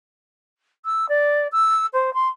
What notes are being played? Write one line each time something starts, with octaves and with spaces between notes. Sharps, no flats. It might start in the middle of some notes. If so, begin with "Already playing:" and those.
E6
D5
E6
C5
C6